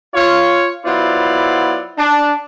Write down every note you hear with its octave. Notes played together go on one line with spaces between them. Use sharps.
F4 C#5
F#3 B3 E4 F4 C5 D5
D4